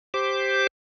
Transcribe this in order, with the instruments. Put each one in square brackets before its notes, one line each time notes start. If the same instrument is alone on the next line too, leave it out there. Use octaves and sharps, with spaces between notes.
[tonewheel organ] G4 C5 D6